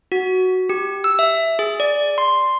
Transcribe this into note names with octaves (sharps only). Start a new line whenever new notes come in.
F#4
G4
E6
E5
G#4
D5
C6